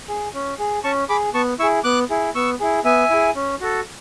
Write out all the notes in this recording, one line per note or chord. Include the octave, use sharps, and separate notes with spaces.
G#4
C#4
G#4
C#4 A5 C#6
G#4 B5 D6
B3 A5 C#6
E4 G#4 C#6 E6
B3 D6 F#6
E4 G#4
B3 C#6 E6
E4 G#4
B3 E5 G#5
E4 G#4
C#4
F#4 A4